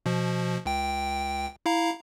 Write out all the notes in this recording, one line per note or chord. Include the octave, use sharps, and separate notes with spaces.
B2 F3
C#2 G5
E4 F5 A#5